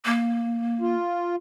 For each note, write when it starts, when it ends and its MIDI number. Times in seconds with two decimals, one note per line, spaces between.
0.05 0.96 58
0.81 1.36 65